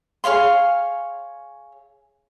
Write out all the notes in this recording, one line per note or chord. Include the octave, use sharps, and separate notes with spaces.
G#4 C#5 F5 C6